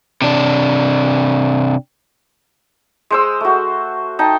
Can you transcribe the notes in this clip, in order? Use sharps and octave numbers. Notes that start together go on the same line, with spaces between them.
C3 D4
G#3 C5 E6
A3 F#4
D#4 G5 A5